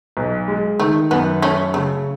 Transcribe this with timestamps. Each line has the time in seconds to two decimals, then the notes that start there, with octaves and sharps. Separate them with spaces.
0.17 B1
0.48 G#3
0.79 D#3 A3
1.11 F#2 B3
1.42 A3 C#4
1.74 C#3 A3